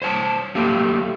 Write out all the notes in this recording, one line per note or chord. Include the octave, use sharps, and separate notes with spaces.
C5 C#5 G#5 A5
F#3 A3 A#3 G4